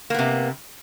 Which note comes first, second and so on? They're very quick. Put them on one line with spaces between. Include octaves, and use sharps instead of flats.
A#3 B3 C3